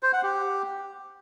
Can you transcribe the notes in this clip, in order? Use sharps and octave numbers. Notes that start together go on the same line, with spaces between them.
C5
F#5
G4